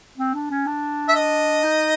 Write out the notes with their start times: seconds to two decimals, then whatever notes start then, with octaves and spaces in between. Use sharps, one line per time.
0.18 C4
0.35 D4
0.51 C#4
0.66 D4
1.09 E5
1.15 D#5
1.64 D#4